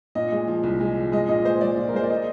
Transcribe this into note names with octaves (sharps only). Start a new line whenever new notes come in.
A#2 D#5
G#3
F3
C2
G#3
F3
G#3 D#5
A#2 D#5
G#3 C5
G#3 D5
A#2
A#4
G#3 C5
D5
D#5